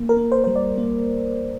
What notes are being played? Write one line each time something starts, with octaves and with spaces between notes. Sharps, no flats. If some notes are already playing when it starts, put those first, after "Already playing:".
Already playing: A#3
A#4
A#3
C5
G3 C5
D5
A#3